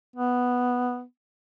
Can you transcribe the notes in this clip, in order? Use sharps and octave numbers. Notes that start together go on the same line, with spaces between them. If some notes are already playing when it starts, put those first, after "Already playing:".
B3